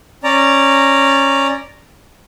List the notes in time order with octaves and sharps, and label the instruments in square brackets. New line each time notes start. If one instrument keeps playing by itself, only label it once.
[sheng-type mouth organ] C#4 D5 A#5